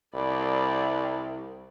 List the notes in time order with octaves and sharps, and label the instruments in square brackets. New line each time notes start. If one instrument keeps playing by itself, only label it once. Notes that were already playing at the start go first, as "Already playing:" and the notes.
[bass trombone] C2 [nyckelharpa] D5 B5